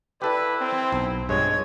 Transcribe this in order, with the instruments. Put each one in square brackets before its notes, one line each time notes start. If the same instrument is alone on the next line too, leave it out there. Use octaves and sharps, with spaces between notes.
[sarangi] E4 [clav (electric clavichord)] G4 A4 D5 [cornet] B4
[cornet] C4
[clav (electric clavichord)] B1
[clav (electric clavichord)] G2 F3 [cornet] G#3 [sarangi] C#5